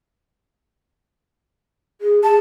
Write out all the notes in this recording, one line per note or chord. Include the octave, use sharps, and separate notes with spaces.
G#4
G#4 A5